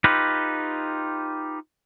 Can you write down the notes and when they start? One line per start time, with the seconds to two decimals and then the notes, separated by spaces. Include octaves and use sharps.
0.04 D#4 F4 G4 B4